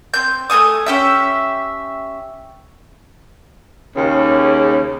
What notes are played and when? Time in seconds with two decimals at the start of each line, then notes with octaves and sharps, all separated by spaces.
0.14 C4 G6
0.50 A3 A#3 G#5 D#6
0.86 C#4 G4 E5
3.95 D#2 C#3